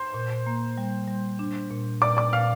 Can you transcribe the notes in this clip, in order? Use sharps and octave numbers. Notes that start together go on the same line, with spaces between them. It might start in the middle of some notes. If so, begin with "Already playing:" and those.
Already playing: C5 C6
A#2
A#3
G3
G3
D4
A#2
A#2 D5 D6
D5 D6
A#2 F5 F6